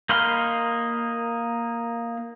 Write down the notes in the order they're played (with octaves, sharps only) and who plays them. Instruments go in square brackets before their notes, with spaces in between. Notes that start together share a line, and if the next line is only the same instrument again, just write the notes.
[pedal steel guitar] A#3 D#4 B5 C6 F6